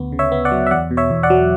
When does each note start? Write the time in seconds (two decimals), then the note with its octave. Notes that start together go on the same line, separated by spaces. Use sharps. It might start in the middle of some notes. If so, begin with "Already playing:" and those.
Already playing: D2 B3
0.12 C#3
0.19 C#5 E5
0.32 B3
0.45 D5 F#5
0.51 F#3
0.66 E5
0.71 E2 D5 F#5
0.91 B2
0.97 C#5 E5
1.10 E2
1.23 D5 F#5
1.30 F#3